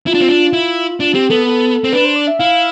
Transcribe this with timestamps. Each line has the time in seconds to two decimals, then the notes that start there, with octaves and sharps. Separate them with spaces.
0.06 E4 F4
0.14 D4
0.21 C4
0.29 D4
0.53 E4
1.00 D4 F4
1.14 C4 G4
1.30 B3 A4
1.46 A4
1.84 C4
1.93 D4 B4
2.05 C5
2.16 D5
2.27 E5
2.39 E4 F5